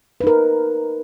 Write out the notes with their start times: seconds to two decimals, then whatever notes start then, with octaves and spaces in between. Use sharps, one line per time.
0.21 B4
0.24 D#4
0.27 A#4